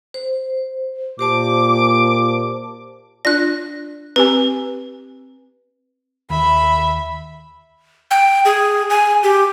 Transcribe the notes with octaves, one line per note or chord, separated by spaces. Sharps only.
C5
A#2 G4 C5 A5 D6
D4 F4 D5 F#6 A#6
C4 G4 B4 G#5
D#2 E5 B5
G5
G#4
G#5
G4